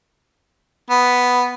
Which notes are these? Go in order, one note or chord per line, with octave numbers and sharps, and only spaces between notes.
B3